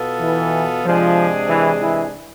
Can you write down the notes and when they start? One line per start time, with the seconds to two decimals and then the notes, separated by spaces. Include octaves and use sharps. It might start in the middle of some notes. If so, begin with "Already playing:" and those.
Already playing: B2 B3 F4 A4
0.20 E3
0.85 C3 F3 G#3 D4 G#4
1.49 E3
1.81 E3